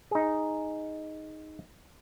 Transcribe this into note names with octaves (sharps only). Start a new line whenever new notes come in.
D#4 G#4